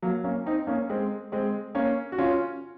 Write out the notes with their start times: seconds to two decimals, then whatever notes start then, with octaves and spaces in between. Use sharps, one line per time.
0.02 F#3 A#3
0.24 A#3 C#4
0.46 C4 D#4
0.67 A#3 C#4
0.89 G#3 C4
1.32 G#3 C4
1.75 A#3 C#4
2.12 F#4
2.18 C#4 F4